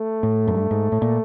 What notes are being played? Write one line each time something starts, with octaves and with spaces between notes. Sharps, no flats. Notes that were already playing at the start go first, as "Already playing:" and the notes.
Already playing: A3
A2
F#2
G2
G#2
A2
A#2